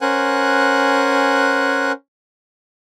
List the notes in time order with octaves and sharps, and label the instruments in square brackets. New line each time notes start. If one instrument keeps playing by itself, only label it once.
[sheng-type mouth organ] C#4 A#4 C5 F#5 G#5 F#6